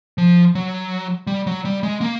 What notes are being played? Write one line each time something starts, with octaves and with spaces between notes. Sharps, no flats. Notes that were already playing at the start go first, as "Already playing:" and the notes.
F3
F#3
G3
F#3
G3
G#3
A#3